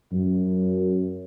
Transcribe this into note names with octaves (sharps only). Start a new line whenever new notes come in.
F#2